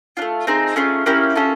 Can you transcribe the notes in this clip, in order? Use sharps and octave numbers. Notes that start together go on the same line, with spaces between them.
A3 D4 F4
C4 D#4 G#4 C5
A3 C#4 F4 G#4
A#3 C#4 E4 G4
C#4 F4 A4